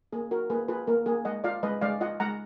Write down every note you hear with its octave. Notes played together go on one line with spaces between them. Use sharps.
A#3 G#4
F#4 A#4
A#3 G#4 B4
F4 G#4 B4
A#3 A#4
A#3 G#4
G#3 D#5 F#5
F4 D5 F5
G#3 B4 D#5
G#3 D5 F5
F4 D#5 F#5
G#3 F#5 A#5